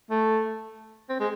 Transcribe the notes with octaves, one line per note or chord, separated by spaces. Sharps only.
A3
C4
G#3